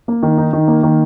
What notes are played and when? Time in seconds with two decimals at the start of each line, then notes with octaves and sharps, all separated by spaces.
0.08 A#3
0.23 D#3
0.38 D#4
0.53 D#3
0.68 A#3
0.83 D#3